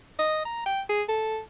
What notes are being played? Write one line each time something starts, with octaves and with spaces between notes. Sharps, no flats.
D#5
A#5
G5
G#4
A4